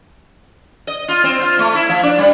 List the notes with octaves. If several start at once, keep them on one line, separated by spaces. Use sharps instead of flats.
D#5
F4
C4
F4
A3
E4
F3
D4
G3